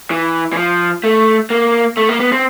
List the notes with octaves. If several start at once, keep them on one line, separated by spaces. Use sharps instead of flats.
E3
E3
F3
A3
A#3
A3
A#3
B3
C4